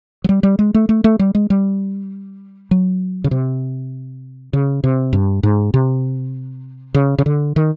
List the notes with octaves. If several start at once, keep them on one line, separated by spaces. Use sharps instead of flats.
F#3
G3
G3
G#3
A3
A3
A3
G3
G#3
G3
F#3
C#3
C3
C#3
C3
G2
G#2
C3
C#3
C#3
D3
D#3